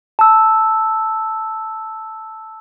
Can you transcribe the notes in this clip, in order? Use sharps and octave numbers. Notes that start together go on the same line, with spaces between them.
A5 E6